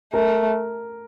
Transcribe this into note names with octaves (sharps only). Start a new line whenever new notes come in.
A3 A#4